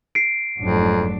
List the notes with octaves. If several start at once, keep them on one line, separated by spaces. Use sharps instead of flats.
C7 D7
F1 F2 G#2 F#3 D4